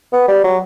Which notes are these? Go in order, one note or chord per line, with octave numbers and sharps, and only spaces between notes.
B3
G3
F#3